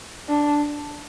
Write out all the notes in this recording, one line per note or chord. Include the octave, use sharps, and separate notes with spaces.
D4